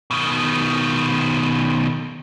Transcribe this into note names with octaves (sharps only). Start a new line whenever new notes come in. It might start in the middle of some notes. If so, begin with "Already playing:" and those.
B2 D#3